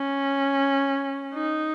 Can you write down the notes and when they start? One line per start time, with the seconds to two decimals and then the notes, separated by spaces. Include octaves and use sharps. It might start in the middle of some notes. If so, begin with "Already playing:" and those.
Already playing: C#4
1.34 D#4